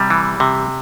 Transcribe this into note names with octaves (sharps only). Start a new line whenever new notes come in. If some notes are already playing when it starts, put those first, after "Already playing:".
Already playing: C3 G3
E3
C3